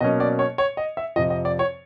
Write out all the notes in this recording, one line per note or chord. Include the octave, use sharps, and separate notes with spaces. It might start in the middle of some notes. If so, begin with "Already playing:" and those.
B2 F#3 A#3 C#4 D#5
D5
C#5
C#5
D#5
E5
F2 C3 F3 D#5
D#5
D5
C#5